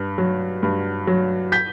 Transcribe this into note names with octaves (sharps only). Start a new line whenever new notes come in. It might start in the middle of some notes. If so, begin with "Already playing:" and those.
Already playing: G2
F#3
G2
F#3
G6 B6